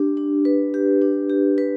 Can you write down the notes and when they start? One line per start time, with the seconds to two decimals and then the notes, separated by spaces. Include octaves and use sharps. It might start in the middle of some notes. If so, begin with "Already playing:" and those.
Already playing: D4 G4
0.17 D4
0.45 B4
0.74 G4
1.02 D4
1.30 G4
1.58 B4